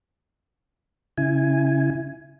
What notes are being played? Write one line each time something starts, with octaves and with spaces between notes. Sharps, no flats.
C#3 E4 G#5